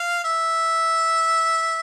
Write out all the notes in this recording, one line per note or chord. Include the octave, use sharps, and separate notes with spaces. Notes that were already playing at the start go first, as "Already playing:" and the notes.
Already playing: F5
E5